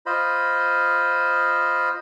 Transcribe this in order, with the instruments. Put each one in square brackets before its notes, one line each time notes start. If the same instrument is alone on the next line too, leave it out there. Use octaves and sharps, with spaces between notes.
[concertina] F4 C5 D#5 B5